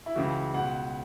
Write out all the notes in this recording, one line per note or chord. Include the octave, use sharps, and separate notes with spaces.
E4
C#2 C#3 E3 F#4
C#2 B2 F#5